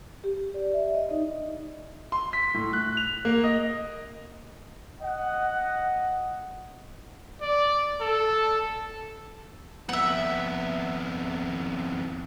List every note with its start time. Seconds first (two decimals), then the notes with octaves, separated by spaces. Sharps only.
0.24 G4
0.54 D5
0.74 E5
0.94 D#5
1.11 D#4
2.12 C6
2.33 B6
2.54 A2
2.73 F#6
2.97 F7
3.25 A#3
3.44 D#5
5.01 D#5 F#5
7.41 D5
8.01 A4
9.89 F2 B3 E5 F#5